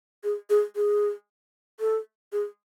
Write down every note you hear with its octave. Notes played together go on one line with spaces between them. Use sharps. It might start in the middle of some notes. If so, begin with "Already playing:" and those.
G#4
G#4
G#4
A4
G#4